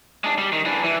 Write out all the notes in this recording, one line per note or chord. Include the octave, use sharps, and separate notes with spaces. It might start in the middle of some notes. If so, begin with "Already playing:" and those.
G#3 D4
G3
D#3
E3 D4
E3